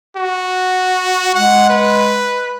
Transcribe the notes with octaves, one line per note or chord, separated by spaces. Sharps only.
F#4
G#3 F#5
B4